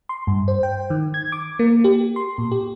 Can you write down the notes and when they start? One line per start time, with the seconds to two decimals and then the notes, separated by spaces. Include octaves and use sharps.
0.09 C6
0.27 G2
0.48 C5
0.63 G5
0.90 D#3
1.14 G#6
1.32 D6
1.59 A#3
1.84 G4
2.16 C6
2.38 A#2
2.51 G4